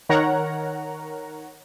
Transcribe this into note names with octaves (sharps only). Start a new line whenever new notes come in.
D#3 A#4 C#5 F#5 A#5